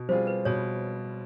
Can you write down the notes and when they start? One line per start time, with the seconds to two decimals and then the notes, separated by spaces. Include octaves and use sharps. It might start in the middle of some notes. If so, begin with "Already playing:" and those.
Already playing: B2
0.09 G3 C4 F4 G#4 C5
0.27 B4
0.45 B2 C#5